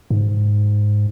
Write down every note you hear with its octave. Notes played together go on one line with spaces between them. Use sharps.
G#2